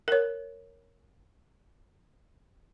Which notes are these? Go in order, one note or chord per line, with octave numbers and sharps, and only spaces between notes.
A#4 C#5